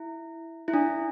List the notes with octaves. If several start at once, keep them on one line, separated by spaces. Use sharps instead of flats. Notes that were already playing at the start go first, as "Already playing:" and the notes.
Already playing: E4
E4
D4